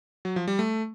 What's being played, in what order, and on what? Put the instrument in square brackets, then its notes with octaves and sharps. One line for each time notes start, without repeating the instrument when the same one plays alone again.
[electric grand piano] F#3
F3
G3
A3